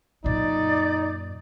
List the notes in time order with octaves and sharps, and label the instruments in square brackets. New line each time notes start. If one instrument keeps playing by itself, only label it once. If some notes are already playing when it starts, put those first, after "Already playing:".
[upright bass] F#2 A#2 [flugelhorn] D#4 [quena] D5